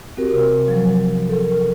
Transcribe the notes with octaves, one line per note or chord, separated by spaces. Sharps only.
C4 F#4 G4 A#4
C3
F3 F#3
A4 A#4